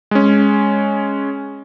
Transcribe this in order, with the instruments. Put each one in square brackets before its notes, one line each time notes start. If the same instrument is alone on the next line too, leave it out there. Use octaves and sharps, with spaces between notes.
[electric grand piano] G#3 C#4